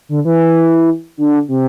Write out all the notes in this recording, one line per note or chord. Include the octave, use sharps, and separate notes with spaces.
D3
E3
D3
C3